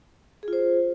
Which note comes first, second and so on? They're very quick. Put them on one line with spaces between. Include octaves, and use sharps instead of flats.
G#4 F4 C5